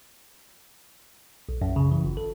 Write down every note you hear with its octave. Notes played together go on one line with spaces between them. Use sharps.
B1
F#2
C#3
E3
G1
A4